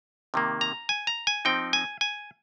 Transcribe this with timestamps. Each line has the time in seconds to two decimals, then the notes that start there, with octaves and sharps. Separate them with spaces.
0.34 C3 D#3 A#3
0.61 A#5
0.89 G#5
1.07 A#5
1.27 G#5
1.45 F3 C4 D#4 G5
1.73 G#5
2.01 G#5